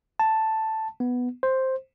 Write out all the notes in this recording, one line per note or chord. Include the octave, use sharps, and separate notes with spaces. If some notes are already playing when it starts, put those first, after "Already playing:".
A5
B3
C5